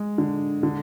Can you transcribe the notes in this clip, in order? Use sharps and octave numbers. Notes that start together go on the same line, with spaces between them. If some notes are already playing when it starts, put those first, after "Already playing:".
Already playing: G#3
D3
D3